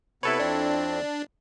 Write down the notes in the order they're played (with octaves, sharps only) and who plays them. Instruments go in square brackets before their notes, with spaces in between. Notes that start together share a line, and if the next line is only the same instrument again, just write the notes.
[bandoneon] C3 B3 [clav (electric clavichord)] E4 A4 C#5 [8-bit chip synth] B4
[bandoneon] F2 C4 [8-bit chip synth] D4